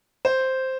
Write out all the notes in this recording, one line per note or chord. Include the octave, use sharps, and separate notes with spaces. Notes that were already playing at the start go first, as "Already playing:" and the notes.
C5